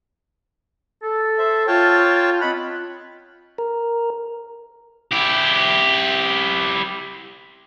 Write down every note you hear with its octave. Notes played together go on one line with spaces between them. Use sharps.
A4
C5 E5
F4 C#5 G5 A5
C4 D#5 F#5 B5
A#4
E4 G4